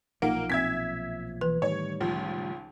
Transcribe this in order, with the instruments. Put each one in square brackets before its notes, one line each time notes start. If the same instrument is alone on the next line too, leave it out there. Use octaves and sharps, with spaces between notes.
[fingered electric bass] B1 A#2 F3 [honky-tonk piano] A#3 [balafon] D#4 F#5
[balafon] C4 [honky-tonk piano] E5 G#6 B6
[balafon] E3 B4
[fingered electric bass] A2 D#3 G3 [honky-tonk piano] C#5
[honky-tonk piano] C#2 F3